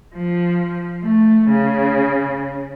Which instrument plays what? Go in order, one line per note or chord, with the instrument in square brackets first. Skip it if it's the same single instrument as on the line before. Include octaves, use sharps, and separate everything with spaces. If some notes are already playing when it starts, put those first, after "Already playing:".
[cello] F3
A3
C#3